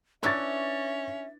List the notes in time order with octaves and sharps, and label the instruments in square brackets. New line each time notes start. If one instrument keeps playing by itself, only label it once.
[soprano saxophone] C#4 [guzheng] D4 E4 B4 [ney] E5 [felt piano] C#6 A6